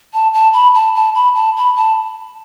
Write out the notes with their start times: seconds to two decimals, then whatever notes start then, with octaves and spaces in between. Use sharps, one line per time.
0.14 A5
0.33 A5
0.53 B5
0.75 A5
0.95 A5
1.15 B5
1.35 A5
1.56 B5
1.76 A5